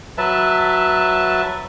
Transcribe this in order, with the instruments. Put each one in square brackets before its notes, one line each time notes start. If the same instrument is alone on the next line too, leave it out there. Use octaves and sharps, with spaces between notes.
[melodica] F#3 B4 E5 A5